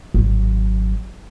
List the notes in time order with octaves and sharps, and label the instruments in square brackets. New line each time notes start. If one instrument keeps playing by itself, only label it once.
[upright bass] G#1 F#3